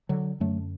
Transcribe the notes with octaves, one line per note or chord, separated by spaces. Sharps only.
D3 F#3
F#2 D3 F#3 A3